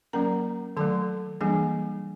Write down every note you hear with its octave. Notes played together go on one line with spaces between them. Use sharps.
F#3 A#3 C#4 A#4 A#5
D#3 F#3 A3 A4 A5
E3 G3 A#3 D4 G#4 G#5